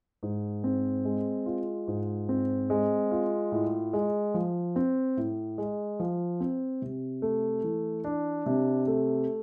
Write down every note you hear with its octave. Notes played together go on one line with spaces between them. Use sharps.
G#2
C4
G#3
F4
G#2
C4
G#3
F4
A2
G#3
F3
C4
A2
G#3
F3
C4
C3
A3
E3
D4
C3
A3